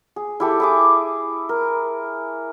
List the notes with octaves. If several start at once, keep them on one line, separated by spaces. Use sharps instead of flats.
G#4
E4 G4 A4
E4 G#4 D6
A#4